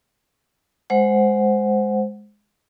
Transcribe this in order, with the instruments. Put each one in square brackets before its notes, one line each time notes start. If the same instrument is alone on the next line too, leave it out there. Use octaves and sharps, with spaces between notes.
[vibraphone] G#3 C5 F#5